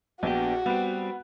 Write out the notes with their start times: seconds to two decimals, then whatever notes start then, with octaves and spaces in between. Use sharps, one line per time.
0.23 A#1 B3 D4 F#4 G4
0.66 G3 B3 C4